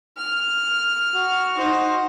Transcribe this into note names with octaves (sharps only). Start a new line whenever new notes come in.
F6
F#4
D#4 C5